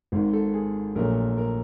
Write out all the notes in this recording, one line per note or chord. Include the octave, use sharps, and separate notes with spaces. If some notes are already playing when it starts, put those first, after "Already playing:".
G#1 G#2 D#3
A4
G#4
A#1 A#2 F#3 A3 A#4
A#4